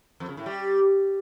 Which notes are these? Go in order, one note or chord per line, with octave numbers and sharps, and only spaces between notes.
F2
C#3
A2
G3